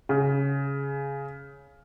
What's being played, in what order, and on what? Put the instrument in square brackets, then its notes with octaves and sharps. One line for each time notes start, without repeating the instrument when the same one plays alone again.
[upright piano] C#3